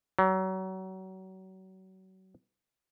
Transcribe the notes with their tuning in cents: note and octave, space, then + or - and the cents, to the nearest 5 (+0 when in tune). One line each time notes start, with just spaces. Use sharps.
F#3 +30